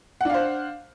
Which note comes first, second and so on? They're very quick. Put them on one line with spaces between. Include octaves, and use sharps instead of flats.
F#5 D4 F5 C5